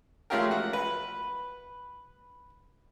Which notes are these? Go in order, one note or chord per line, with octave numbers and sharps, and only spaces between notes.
G#3 A3 C#4 F4 G4 A#4
F#4
B4